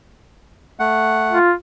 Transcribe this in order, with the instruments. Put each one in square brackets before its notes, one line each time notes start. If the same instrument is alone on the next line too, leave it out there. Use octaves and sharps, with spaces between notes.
[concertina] A3 F#5
[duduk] F4